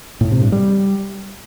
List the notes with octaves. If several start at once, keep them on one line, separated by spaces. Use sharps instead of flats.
A2
C3
G2
G3